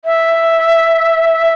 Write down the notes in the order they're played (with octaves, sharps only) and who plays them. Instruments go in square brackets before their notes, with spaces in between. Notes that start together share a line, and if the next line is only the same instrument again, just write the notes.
[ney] E5